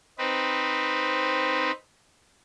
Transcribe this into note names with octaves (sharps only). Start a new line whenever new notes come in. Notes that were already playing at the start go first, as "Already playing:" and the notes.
C4 D#4 B4